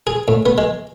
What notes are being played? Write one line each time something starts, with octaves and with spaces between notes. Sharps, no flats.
G#4
A2
B3
G#3